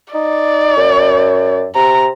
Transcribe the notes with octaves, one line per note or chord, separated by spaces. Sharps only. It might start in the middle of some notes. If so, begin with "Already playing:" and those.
D#4 D5
F#2
C3 A#5